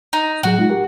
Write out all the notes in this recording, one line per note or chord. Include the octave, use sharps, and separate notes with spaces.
D#4
A2 F#3 F#4 G#4
G#3 D#4 F4
G4 A#4 F#5